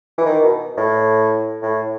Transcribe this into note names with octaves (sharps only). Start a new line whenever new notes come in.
E3
D#3
B2
A2
A2